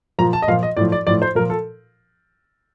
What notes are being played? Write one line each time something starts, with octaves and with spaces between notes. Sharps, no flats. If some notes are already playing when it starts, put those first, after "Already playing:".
A#2 F3 A#5
A5
D#5
A#2 F3 F5
D#5
A2 F3 D5
D5
A2 F3 D5
C5
A#2 F3 A#4
A4